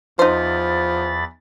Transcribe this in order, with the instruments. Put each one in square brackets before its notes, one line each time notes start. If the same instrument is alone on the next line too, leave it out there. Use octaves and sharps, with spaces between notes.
[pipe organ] E2 B5 A6 [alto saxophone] F3 [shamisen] D#4 C5